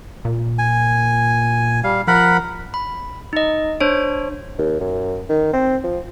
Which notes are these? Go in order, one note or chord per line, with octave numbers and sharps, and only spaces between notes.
A#2
G#5
G3 F5
F3 A#4 F#5 B5
B5
D#4 D#5
D4 C5 C#5
D#2
F#2
D#3
C4
F3